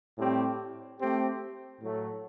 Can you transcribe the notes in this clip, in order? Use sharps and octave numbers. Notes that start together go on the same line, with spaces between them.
A2 G3 C4 G4
A3 C4 G4
A2 F#3 A3